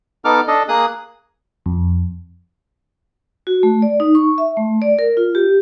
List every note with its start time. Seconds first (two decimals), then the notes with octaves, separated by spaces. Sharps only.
0.25 B3 D#4 A4 D6 F6
0.48 D4 A4 D#5
0.69 A#3 G#4 D#6 F#6
1.66 F2
3.47 F#4
3.63 A3
3.82 D5
4.00 D#4
4.15 C#6
4.38 E5
4.57 A3
4.82 D5
4.99 A#4
5.17 F4
5.35 G4